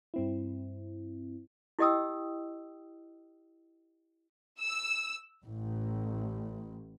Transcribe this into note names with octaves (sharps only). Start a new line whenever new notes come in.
G2 C4 E4
E4 G4 D#5 G5 D#6 E6
E6
A1